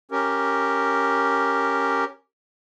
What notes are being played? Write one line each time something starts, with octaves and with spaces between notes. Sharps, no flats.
C#4 G4 A#4